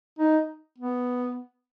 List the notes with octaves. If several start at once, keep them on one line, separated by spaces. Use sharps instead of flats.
D#4
B3